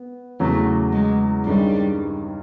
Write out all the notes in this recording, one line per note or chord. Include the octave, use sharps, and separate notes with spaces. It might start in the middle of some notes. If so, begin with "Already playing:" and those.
Already playing: B3
E2 C#3 F#3 A3
G#3
G2 D#3 G3 G#3 C#4